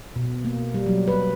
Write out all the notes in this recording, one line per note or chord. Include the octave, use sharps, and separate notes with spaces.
B2
A#3
G3
F#3
B4